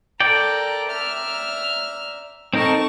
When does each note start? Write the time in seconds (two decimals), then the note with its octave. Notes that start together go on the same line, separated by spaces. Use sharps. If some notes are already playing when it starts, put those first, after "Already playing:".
0.20 A4 A#4 D5 G5 A#5
0.87 E5 A#5 F6
2.53 C4 D#4 A4 A#4 A5 C#6